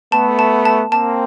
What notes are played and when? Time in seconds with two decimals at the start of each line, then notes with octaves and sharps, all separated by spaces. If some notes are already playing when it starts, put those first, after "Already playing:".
0.12 A3 B3 A5
0.39 A5
0.65 A5
0.92 A#3 C4 A5